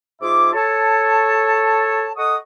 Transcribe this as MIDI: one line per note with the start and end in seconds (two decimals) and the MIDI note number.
0.22 0.52 44
0.22 0.52 65
0.22 0.52 68
0.22 0.52 76
0.22 0.52 86
0.53 2.11 69
0.53 2.11 73
0.53 2.11 81
2.17 2.36 69
2.17 2.36 75
2.17 2.36 78
2.17 2.36 85
2.17 2.36 87